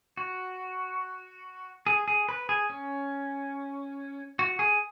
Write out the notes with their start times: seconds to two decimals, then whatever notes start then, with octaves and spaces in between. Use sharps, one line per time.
0.17 F#4
1.87 G#4
2.08 G#4
2.29 B4
2.49 G#4
2.70 C#4
4.39 F#4
4.59 G#4